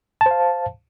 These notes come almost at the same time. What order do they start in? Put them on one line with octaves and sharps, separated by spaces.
A5 C5 F5